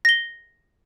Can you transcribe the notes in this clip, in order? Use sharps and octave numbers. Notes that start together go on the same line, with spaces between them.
A#6 G7